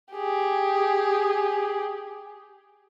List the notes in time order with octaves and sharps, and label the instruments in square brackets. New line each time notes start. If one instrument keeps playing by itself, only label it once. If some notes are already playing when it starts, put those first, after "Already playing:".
[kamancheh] G4 G#4